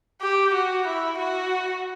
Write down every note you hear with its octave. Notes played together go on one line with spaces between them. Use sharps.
G4
F#4
E4
F#4